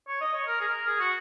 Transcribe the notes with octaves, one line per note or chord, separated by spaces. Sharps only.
C#5
D#5
C#5
A#4
G#4
A#4
G#4
F#4